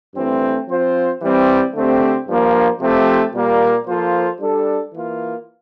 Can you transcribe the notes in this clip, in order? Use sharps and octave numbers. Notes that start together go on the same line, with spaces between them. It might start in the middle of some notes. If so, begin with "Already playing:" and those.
G2 E3 A3 C4
F3 C4 F4 C5
E3 G3 C4
D3 A3 C4 G4
G2 F3 A#3
C3 F3 A3 C4 G4
A#2 G3 A#3
F3 A#3 F4 A4 C5
G3 D4 A4
E3 A#3 F4